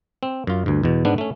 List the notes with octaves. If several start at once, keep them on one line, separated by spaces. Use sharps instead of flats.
C4
F#2 F4
D2 G2
E2 B2
G#2 B3 D4
A3 C#4